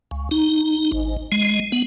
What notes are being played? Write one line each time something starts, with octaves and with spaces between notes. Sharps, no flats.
C#2
D#4
G#1
G#3
B3